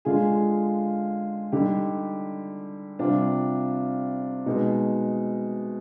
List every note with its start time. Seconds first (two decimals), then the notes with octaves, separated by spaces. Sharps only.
0.05 D3 G#3 F4 G#4
1.52 D3 G3 D#4 G4
2.99 C3 G3 D4 F4
4.46 B2 G#3 D#4